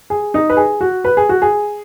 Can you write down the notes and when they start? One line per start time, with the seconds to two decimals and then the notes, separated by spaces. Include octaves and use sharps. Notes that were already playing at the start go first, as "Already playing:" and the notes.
0.10 G#4
0.34 D#4
0.50 B4
0.57 G#4
0.81 F#4
1.05 B4
1.17 G#4
1.29 F#4
1.42 G#4